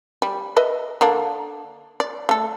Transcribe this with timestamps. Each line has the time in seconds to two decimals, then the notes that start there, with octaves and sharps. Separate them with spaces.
0.22 G3
0.56 B4 D#5 E5
1.01 D3 A#3 D4
2.00 D5
2.29 A3 A4